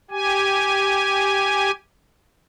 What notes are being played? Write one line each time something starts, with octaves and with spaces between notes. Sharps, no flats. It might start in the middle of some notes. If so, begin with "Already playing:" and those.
G4 G#5